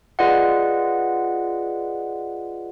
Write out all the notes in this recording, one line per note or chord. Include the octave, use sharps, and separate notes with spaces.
F4 G#4 B4 D5 D#5 F#5